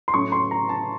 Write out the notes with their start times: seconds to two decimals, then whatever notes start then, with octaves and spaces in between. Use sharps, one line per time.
0.08 C6
0.14 A2 F#3 A3 C#4 C#6
0.32 C6
0.51 A#5
0.69 A5